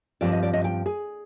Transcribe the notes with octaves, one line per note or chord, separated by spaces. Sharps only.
G2 F3 C4 D5
D#5
D5
D#5
G5
G#4